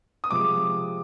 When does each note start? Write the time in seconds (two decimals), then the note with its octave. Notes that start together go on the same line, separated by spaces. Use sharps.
0.24 D#6
0.31 C3 F3 G#3 D6